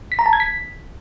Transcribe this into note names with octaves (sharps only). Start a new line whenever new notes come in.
B6
A#5
A5
G#6
B6